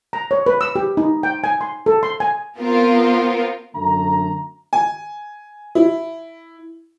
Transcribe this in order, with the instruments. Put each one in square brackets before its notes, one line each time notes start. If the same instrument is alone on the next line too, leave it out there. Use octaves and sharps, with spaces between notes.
[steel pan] A#5
C#5
B4
E6
G4
D#4
G5
G#5
C6
A4
C6
G#5
[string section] B3 C4 F4 A#4
[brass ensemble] F#2 D3 A3 A#5
[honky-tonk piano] G#5
E4